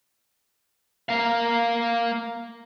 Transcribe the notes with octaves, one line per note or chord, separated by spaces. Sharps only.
A#3 F5